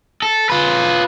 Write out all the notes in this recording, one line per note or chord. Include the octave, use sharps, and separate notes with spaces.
A4
F4 B4